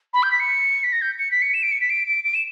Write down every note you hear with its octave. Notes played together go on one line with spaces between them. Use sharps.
B5
G6
B6
C#7
B6
A#6
G6
C#7
B6
C#7
E7
D7
C#7
B6
D7
D7
D7
E7